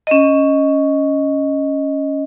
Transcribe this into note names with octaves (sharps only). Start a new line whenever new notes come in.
C#4 D#5